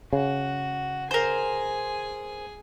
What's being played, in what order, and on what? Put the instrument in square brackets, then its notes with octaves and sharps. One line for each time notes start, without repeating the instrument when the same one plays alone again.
[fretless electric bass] C#3 [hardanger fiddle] F#4
[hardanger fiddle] G#4 G#5 [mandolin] A#4 C5